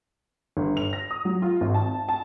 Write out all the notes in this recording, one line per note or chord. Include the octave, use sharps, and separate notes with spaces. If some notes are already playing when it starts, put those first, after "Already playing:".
G1
F7
A#6
D#6
F#3
F4
G#1
A5
A5